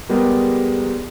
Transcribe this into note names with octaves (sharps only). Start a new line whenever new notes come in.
G3 G#3 B3 G4 G#4 A#4